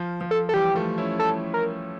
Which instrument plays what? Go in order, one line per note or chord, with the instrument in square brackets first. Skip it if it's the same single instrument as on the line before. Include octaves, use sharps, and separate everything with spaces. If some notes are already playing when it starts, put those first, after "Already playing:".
Already playing: [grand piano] F3
F3
[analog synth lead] A4
A4
[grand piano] E3 G3 [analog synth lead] G4
[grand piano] F3 A3
C#4 E4
[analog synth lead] A4
A#4